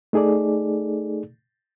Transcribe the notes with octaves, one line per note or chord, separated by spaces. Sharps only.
A3 D#4 G#4 A4 D5